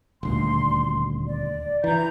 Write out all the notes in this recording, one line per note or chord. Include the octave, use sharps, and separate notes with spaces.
D#1 D2 C6
D5
E3 A#5 G6